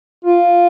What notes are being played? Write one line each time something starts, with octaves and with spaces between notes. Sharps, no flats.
F4